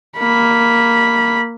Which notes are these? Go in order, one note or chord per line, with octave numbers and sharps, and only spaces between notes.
A#3 B5